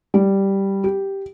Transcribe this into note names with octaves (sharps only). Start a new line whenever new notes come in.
G3
G4